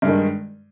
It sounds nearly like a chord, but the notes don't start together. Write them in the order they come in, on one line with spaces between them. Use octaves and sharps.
G2 G#3 D#3